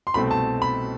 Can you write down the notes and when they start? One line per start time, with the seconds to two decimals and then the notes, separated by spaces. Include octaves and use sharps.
0.07 C6
0.14 C2 B2 A3 C4 B5
0.31 A5
0.62 B5